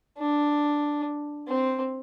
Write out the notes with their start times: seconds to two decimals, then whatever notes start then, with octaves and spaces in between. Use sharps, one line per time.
0.18 D4
1.48 C4